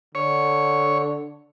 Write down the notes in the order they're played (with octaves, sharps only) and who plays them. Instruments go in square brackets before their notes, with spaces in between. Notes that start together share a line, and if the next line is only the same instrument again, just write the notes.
[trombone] D3 [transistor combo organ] C#5